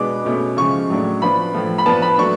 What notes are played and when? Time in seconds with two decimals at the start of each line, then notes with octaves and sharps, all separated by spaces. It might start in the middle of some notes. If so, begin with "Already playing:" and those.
Already playing: B2 G#3 B3 D4 D6
0.25 B2 A3 C#4
0.57 C#3 F3 G#3 C#6
0.90 A2 F#3 A3 D4
1.22 F3 B3 D4 B5
1.54 A2 F3 A3
1.78 B5
1.86 F3 B3 D4 A5
2.02 B5
2.18 F#3 A3 D4 C#6